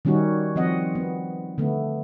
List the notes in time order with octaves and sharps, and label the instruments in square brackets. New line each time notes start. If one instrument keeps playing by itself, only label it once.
[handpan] D#3 G3 C#4 D#4 F#4
F3 C4 D#5 F#5
B3
D3 A3 B3